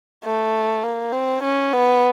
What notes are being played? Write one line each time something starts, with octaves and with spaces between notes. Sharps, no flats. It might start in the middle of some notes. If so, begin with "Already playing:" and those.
A3
A#3
C4
C#4
B3